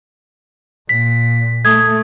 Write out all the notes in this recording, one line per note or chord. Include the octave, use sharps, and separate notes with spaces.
A#2 B6
A3 D#6 G#6